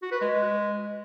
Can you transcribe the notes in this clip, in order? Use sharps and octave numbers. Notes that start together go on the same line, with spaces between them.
F#4
B4
G#3